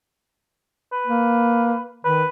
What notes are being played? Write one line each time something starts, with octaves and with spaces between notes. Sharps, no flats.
B4
A#3
D#3 B4